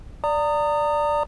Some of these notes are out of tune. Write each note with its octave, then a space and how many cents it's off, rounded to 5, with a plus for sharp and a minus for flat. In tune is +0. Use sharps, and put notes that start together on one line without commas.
D5 +0 A#5 -30 D#6 -15